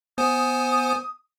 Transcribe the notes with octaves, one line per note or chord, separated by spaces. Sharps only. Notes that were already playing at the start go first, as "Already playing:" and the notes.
B3 C5 G#5 D#6